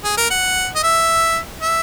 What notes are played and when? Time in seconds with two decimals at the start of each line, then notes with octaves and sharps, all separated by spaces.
0.04 G#4
0.17 A#4
0.30 F#5
0.76 D#5
0.83 E5
1.62 E5